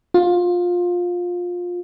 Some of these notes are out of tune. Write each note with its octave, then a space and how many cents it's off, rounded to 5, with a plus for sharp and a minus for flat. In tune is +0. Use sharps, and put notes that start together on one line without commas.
F4 +20